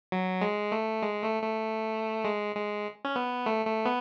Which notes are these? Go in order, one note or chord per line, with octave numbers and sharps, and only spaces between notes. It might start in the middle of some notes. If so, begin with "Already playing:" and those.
F#3
G#3
A3
G#3
A3
A3
G#3
G#3
C#4
B3
A3
A3
B3